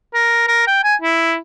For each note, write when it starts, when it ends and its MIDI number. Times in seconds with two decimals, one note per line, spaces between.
0.14 0.44 70
0.48 0.64 70
0.67 0.83 79
0.84 0.95 80
1.02 1.36 64